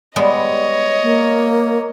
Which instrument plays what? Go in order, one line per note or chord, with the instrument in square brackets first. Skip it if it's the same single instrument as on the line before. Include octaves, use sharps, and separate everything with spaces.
[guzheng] G3 G#3 B3 [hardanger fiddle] C#5 D#5
[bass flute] A#3